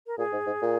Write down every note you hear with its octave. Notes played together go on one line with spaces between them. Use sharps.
A#4
A#2 G#4
G#2
G#2
A#2